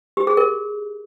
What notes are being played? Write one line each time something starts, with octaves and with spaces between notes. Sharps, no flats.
G4
G#4
A#4